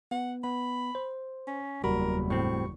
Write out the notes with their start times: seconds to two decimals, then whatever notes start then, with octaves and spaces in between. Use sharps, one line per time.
0.11 B3 F#5
0.44 B3 B5
0.95 C5
1.47 C#4
1.84 F#1 E2 G3 F#4 A#4 B5
2.30 A2 C4 C#6